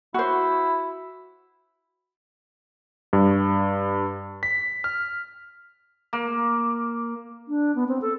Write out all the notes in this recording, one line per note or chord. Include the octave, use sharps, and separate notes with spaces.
E4 F#4 C5
G2
B6
F6
A#3
D4
B3
C4
A4